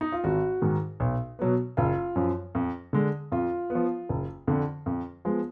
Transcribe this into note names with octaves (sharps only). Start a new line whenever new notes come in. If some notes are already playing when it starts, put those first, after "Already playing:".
D#4
F4
G#1 F#4
G#2 D#3
B1
B2 F#3 B3
F#1 F4
F#2 F3
F2
D3 G#3
F2 F4
B3
F3
F#1
F2 D3
F2
F3 G#3 B3